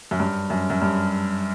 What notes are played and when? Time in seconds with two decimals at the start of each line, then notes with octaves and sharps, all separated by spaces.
0.11 F#2
0.20 G2
0.50 F#2
0.70 F#2
0.82 G2